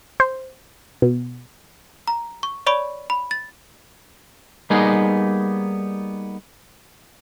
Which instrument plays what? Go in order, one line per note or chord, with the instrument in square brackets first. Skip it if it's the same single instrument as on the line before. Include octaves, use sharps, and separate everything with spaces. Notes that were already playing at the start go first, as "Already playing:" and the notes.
[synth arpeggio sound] C5
B2
[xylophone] A#5
C#6
C#5 D5 B5 C#6 D7
B5
A6
[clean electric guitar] G3 A#3 B3 D#4 G#4